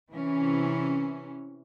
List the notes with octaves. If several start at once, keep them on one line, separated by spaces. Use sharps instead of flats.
C3 E3 C#4